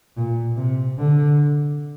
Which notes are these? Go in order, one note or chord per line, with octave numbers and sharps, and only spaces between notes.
A#2
C3
D3